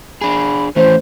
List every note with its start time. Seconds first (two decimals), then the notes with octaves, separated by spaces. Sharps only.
0.21 D4 G#4 B5
0.76 E3 A3 C#4 C5